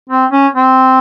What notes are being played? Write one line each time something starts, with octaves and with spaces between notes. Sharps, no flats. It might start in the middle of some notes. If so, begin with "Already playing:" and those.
C4
C#4
C4